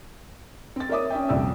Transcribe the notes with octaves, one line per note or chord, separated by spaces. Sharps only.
C4 A6
A#4 C#5 D5 E5 D6 D#6
C#4 E5 G5
D#1 C2 F2 D5 G5 E6